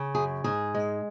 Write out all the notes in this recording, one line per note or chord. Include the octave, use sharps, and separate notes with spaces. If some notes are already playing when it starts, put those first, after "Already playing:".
Already playing: C#3
F#2 G#4
G#2 G#4
G#3